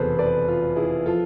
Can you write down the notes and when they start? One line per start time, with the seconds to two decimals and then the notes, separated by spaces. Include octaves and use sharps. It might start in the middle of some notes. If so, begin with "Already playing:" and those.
Already playing: F1 E2 B2 G#4 A4 B4 C5
0.19 B4 D5
0.48 F4
0.76 E4 G#4
1.05 F3 F4 A4